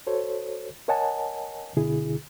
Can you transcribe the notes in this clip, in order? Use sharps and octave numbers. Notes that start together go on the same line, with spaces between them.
F#4 A4 C5 C#5
A#4 C#5 D#5 F#5 G#5 A5
C#2 B2 D3 E4 G#4